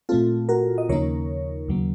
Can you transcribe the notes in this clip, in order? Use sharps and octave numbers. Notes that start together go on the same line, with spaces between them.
A#2 A3 C4 F4 A4
F#4 A#4
D#5
D#2 C#3 F3 A#3 D#4 A#4 C#5
D#2 C#3 F#3 A#3